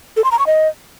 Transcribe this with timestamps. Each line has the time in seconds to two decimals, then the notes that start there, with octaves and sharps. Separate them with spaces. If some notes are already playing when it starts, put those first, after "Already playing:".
0.17 A4
0.24 C6
0.32 A#5
0.39 C#6
0.47 D#5